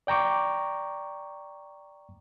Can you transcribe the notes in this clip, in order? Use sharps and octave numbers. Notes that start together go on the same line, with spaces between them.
D5 G5 A#5 C#6 D6